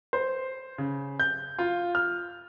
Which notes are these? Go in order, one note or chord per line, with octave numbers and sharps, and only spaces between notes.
C5
C#3
G6
F4
F6